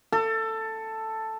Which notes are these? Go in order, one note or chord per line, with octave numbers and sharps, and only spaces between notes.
A4